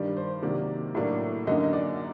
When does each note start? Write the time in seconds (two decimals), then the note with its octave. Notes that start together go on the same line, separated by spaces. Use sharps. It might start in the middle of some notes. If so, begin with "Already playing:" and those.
Already playing: G2 D#3 G3 D5
0.17 C5
0.42 C3 D#3 F#3 A#3 D4 D5
0.95 A2 F#3 A#3 D4
1.47 F#2 D3 F#3 A#3 D#4 D#5
1.64 D#5
1.73 D5